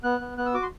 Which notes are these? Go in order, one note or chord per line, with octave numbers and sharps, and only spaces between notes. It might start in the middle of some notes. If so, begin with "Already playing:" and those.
B3 F#6
B3
B3 F#6
E6
F#4 D6
C6